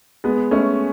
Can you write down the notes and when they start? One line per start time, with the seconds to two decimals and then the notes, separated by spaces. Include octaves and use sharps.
0.24 G#3 B3
0.51 A3 C#4